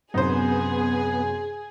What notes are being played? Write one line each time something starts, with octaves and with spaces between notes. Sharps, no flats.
F#2 C3 B3 D#4 G#4 C5